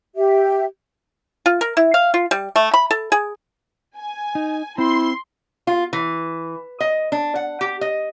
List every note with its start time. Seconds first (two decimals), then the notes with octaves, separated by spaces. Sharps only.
0.16 G4 E5
1.46 F4
1.61 A#4
1.77 E4
1.94 F5
2.14 F4
2.31 G3
2.56 A3
2.74 B5
2.91 A4
3.12 G#4
3.96 G#5
4.35 D#4
4.78 C4 E4 C6
5.67 F4
5.93 E3
6.80 D#5
7.12 D4
7.35 F#5
7.61 G4
7.81 D#5